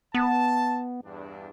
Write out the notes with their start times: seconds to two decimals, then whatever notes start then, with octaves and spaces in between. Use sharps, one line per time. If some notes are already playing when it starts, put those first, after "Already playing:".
0.15 B3 A5
1.05 E2 G2 D4